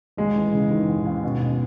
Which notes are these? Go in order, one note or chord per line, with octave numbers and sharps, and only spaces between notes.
D#2 G#3
E3
C#3
D#3 E3
D#2
D#2
B2
B2